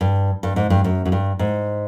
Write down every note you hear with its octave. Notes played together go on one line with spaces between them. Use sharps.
G2
G2
G#2
G2
F#2
F#2
G2
G#2